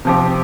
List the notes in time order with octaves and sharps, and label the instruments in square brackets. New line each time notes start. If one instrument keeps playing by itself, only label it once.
[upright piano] C3 F3 C4 G4